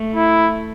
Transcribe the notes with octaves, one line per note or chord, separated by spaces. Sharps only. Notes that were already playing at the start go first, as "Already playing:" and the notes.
Already playing: A3
E4